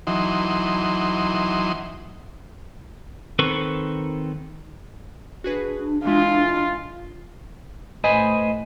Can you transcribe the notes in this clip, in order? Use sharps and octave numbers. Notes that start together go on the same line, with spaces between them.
E3 F#3 D#4 C6
D#3 C4 A4 B4 C#6
D4 F#4 G#4 B4
E3 G#3 E4 F4
A2 B4 C5 D#5 G#5